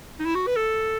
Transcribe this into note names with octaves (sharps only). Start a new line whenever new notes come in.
D#4
E4
F#4
B4
A4